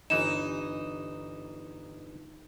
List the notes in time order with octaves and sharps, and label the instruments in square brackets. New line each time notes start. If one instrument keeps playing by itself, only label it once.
[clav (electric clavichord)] G1 E3 G#5 [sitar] D#4 [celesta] E7